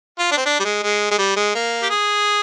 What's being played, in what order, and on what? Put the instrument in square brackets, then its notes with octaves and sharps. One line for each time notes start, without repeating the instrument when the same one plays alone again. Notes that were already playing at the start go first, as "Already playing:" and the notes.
[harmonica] F4
D4
C4
D4
G3
G#3
G#3
G#3
G3
G#3
A#3
G4
G#4